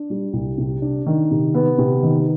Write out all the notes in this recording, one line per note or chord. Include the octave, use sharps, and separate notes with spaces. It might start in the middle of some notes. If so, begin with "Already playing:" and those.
Already playing: D4
G3
C2
C3
D4
D#3
C3
B3
C3
D#3